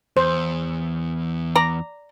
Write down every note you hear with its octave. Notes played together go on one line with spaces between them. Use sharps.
E2 C5
D5 A#5